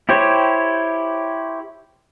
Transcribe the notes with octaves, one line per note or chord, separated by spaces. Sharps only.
E4 G4 C5 C#5